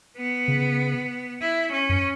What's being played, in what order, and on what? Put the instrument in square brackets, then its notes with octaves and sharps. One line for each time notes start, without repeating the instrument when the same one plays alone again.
[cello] B3
[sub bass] C#3
[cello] E4
C#4
[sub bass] F#2